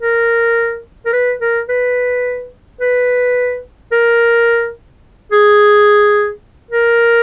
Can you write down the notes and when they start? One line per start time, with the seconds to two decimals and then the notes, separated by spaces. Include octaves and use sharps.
0.01 A#4
1.06 A#4
1.13 B4
1.41 A#4
1.69 B4
2.81 B4
3.92 A#4
5.32 G#4
6.71 A#4